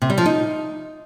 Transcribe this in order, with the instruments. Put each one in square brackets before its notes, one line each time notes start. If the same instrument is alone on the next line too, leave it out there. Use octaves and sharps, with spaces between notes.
[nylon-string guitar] C3
G3
F3
D#4